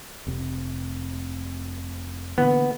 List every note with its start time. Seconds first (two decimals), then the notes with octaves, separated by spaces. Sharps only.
0.27 F1 C3
2.38 A#2 D3 E3 B3